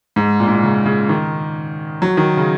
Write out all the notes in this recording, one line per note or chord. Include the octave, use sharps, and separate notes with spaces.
G#2
A#2
G#2
A#2
C#3
C#3
D#3
F#3
D#3
C#3